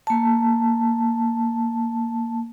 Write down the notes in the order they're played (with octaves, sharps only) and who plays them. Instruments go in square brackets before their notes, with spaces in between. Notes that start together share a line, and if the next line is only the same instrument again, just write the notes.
[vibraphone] A#3 A5